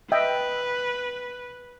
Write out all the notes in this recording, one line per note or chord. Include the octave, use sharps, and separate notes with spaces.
B4 D#5 E5 G5